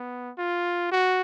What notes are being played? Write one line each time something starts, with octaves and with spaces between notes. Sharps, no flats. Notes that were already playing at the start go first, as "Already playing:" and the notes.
Already playing: B3
F4
F#4